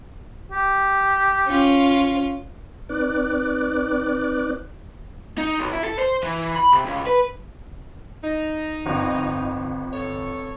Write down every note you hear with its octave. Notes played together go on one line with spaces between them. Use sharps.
G4
C#4 F4
C4 D#4 B4 D5 D6 F#6
D#4
B1
E4
A4
C5
E3
B5
C3
C#2
B4
D#4
G1 F2
A4 C#5